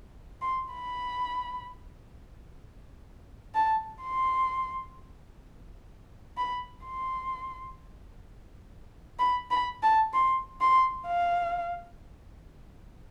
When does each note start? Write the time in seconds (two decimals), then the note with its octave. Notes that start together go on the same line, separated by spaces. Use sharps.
0.42 C6
0.74 B5
3.55 A5
4.02 C6
6.37 B5
6.84 C6
9.19 B5
9.51 B5
9.83 A5
10.14 C6
10.61 C6
11.07 F5